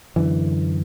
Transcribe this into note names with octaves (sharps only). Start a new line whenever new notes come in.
F#2 D3 E3